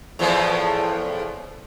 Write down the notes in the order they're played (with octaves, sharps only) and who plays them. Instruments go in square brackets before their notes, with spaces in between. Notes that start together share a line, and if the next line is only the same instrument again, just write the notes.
[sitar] E2 A2 F3